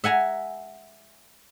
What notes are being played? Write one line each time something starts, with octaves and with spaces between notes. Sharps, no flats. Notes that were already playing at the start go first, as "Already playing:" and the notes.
E5 F#5 G#5 A#5